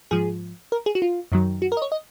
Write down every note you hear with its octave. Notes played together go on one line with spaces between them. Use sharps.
G#2 F3 G#4
A#4
G#4
F#4
F4
F#2 D#3 F#3
F#4
A#4
D#5
C#5
D#5